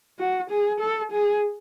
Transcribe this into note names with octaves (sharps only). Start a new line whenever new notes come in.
F#4
G#4
A4
G#4